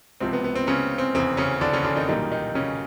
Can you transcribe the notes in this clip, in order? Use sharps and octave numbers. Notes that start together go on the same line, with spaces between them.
C#2 C3 F3 C4
B3
B3
C4
C#3 C#4
C4
F1 E2 C#3 C4
C#3 C#4
D3 D4
C#3 C#4
D3 D4
D#3 D#4
B1 A#2 D#3 G3 D#4
D#3 D#4
C#3 C#4